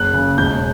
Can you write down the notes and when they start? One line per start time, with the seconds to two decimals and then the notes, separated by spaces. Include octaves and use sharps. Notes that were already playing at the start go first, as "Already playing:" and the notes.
Already playing: F#1 F#6
0.13 C#3
0.38 E1 G6